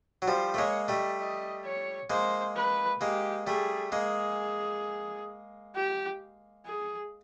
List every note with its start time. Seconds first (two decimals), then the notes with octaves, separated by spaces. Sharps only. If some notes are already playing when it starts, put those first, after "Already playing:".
0.22 F#3
0.28 F3 G3 C5
0.54 A3
0.58 G#3 A#3 C#5
0.88 G3 A3 D#5
1.20 D#5
1.65 C#5
2.10 G#3 A#3 C5
2.56 B4
3.01 G#3 A#3 G4
3.46 G3 A3 G#4
3.92 G#3 A#3 G#4
5.75 G4
6.66 G#4